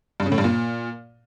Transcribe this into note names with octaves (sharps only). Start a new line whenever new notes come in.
G2
C#3
A2
G2
A#2